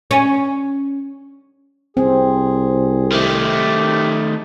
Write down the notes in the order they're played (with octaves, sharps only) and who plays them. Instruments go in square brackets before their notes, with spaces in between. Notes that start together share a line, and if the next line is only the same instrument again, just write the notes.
[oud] C#4
[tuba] C2 [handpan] C4 [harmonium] G#4
[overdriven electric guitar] D#3 A3 [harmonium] G4